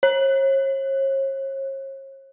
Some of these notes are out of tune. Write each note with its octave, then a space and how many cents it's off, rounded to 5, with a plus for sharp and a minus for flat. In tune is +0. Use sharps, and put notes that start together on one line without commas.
C#5 -40